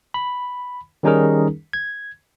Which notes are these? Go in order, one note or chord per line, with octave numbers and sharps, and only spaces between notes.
B5
D#3 G3 C#4 D#4 G#4 A#4
G#6